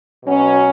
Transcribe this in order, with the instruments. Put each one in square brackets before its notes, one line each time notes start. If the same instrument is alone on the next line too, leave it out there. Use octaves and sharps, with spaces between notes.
[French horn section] B2 F#3 C#4